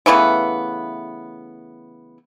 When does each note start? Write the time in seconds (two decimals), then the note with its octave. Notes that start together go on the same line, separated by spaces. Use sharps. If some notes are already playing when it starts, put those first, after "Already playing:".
0.06 C#3 E3 A3 B3